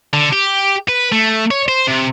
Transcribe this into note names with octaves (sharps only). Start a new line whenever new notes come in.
D3
G4
B4
A3
C#5
C5
C3